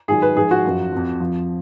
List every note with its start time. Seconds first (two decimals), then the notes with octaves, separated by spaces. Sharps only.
0.08 G#2 D#3 F#3 G#4
0.22 B4
0.36 G#2 F3 G#4
0.51 F#4
0.65 F#2 F3
0.92 F2 F3
1.20 F2 F3